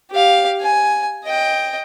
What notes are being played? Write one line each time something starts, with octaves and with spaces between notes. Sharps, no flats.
G4 F5
G#5
D#5 G5